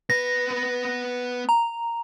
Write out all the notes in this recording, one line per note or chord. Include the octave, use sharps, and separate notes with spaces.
B3 B4 A#6
A#5